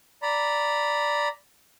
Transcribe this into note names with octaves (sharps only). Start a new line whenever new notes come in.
D5 A#5 B5